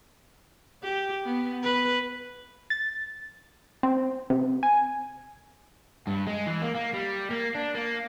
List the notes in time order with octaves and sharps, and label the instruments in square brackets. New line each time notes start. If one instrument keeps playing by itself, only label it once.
[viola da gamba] G4
B3
B4
[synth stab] A6
C4
C3
G#5
[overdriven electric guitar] G2
G#3
E3
A#3
A#3
G3
A#3
D4
A#3